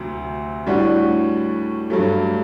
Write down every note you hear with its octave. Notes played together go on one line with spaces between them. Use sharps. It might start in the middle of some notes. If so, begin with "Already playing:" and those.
Already playing: D2 C3 F#3 C4
A2 G3 D4 F#4
G2 F#3 A3